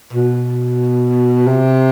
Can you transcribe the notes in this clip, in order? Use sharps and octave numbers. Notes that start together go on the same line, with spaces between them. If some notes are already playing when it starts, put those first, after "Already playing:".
B2
C3